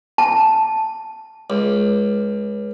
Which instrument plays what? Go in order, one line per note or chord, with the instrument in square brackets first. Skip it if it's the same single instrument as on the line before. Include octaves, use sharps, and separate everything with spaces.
[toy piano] A5
[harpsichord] C#2